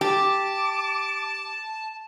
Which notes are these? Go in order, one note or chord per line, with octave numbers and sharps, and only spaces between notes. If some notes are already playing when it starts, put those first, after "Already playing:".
G4 A5 D6